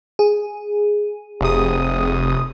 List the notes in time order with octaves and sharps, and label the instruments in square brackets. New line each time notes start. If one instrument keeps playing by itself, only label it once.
[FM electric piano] G#4
[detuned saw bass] F1 [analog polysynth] C3 D#6